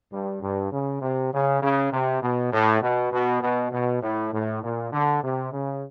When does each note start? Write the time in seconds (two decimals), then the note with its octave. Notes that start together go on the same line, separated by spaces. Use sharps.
0.11 G2
0.42 G2
0.71 C#3
1.02 C3
1.32 C#3
1.61 C#3
1.92 C3
2.22 B2
2.53 A2
2.82 B2
3.13 B2
3.42 B2
3.72 B2
4.02 A2
4.32 A2
4.63 A#2
4.92 D3
5.23 C3
5.52 C#3